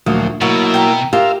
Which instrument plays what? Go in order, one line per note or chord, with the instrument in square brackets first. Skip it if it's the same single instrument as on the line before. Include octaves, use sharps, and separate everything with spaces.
[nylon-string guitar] D2 [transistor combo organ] A#2 F3 F#3 [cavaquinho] D#6
[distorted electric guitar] B2 [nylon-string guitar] F#3 [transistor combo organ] A#3 E4 [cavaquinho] F#4
[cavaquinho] G5 A#5
[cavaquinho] F4 [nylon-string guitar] G4 [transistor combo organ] A#4 E5 F5